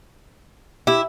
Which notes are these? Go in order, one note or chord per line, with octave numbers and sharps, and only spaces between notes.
E4 G4